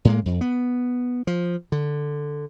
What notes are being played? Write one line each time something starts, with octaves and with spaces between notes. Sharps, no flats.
A2 G#3 A#3
F2
B3
F3
D3